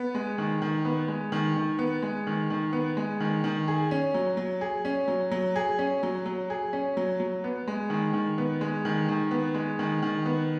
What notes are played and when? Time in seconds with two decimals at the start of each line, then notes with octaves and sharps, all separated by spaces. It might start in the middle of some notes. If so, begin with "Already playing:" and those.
Already playing: B3
0.15 G#3
0.38 D#3
0.62 D#3
0.85 B3
1.08 G#3
1.32 D#3
1.56 D#3
1.79 B3
2.02 G#3
2.27 D#3
2.50 D#3
2.73 B3
2.97 G#3
3.20 D#3
3.44 D#3
3.68 G#4
3.91 C#4
4.14 F#3
4.37 F#3
4.61 G#4
4.85 C#4
5.08 F#3
5.32 F#3
5.56 G#4
5.79 C#4
6.03 F#3
6.26 F#3
6.50 G#4
6.73 C#4
6.97 F#3
7.20 F#3
7.44 B3
7.67 G#3
7.90 D#3
8.13 D#3
8.38 B3
8.61 G#3
8.85 D#3
9.09 D#3
9.31 B3
9.54 G#3
9.79 D#3
10.03 D#3
10.26 B3